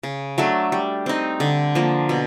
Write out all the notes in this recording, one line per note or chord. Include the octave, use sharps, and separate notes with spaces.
C#3
F#3 A3 D4
G3
C4 D#4
D3
F3 A#3
B2